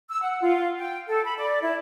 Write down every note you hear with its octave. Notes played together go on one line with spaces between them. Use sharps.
E6
F#5
F4
G5
A4
B5
D5
E4